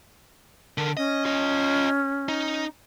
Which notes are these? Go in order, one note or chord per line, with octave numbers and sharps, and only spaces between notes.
D3 A#4
C#4 D#5
F4 D#5
D#4